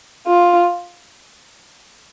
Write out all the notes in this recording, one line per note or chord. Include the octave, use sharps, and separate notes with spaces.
F4